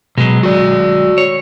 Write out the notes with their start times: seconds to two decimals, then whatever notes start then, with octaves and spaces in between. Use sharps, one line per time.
0.18 B2 F#3 G#3
0.43 F#4 D5
1.18 C#5